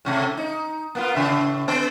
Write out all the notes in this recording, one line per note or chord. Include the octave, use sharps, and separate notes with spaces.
A2 C3 A3
D#4
A#3 B3 F4
A2 C#3 E5
B3